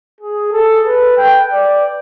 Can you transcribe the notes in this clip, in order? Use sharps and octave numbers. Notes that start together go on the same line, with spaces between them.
G#4
A4
B4
G5
D5